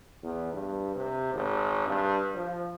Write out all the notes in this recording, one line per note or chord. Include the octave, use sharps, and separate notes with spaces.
E2
G2
C3
G#1
G2
F3